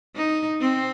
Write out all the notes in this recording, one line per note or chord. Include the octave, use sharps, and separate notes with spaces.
D#4
C4